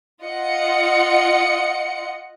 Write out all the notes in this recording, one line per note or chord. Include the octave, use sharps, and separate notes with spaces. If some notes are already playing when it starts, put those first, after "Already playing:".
F4 D#5 F#5 C#7